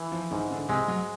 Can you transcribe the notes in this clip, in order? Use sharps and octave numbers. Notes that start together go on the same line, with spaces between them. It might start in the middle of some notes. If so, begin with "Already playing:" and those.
Already playing: E3
F3
G#2 D#3
D3
C3 G#3
F#3